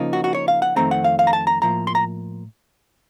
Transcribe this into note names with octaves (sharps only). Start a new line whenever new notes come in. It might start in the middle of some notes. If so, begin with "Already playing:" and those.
Already playing: C#3 F3 A#3 D#4
F#4
F#4
C#5
F5
F#5
F2 D#3 A3 C4 A#5
F#5
F5
F5
A#5
A5
A#5
A2 F3 A#3 A#5
C6
A#5